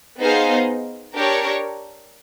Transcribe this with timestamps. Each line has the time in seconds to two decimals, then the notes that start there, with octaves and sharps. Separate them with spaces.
0.20 B3 D#4 G#4 C5 F5
1.14 D4 G4 A#4 C#5